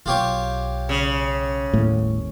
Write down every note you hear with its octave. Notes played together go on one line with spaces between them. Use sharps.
B1 F4 G4 C#5
C#3
G1 D#2 A2